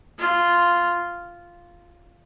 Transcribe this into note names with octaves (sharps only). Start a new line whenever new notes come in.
F4